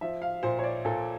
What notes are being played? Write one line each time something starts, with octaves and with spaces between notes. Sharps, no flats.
F3 E5
F5
A#2 C5
C#5
D5
A#2 A4